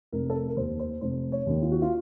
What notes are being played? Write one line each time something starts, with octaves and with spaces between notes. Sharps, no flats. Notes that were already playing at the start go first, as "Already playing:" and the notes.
F1 A#4
A4
A#4
A#4
D#2 D#3 C5
C5
F1 C5
C#5
D#2 D#3
F4
F#4
F4